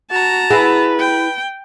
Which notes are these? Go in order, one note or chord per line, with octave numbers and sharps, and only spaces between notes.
F#4 A5 A#5
E4 F#4 G#4 B4
G5